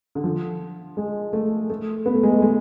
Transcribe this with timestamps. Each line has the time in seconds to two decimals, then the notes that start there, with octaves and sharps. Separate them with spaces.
0.15 D3
0.24 F3
0.97 G#3
1.33 A3
1.70 A3
2.06 B3
2.14 A3
2.23 G#3
2.31 A3
2.42 G#3